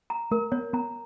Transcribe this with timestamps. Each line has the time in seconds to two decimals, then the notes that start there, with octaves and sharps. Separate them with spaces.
0.10 A#5
0.31 A3 A#4
0.52 B3 C#5
0.73 B3 A#5